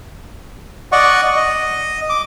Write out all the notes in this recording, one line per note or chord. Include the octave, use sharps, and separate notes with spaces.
D5 D#5 F#5 C#6
D#5
D6